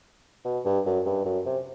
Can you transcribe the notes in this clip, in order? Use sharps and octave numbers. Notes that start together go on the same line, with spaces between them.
B2
G2
F#2
G2
F#2
C3